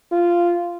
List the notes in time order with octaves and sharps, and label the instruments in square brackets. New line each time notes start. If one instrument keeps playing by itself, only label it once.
[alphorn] F4